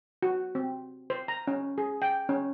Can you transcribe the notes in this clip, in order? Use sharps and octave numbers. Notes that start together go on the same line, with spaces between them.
F#4
C4
C5
A#5
C#4
G#4
G5
C#4